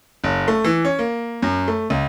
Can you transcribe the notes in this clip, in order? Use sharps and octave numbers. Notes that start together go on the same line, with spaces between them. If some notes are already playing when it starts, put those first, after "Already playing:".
F#1
A3
E3
C#4
A#3
F#2
A3
C#2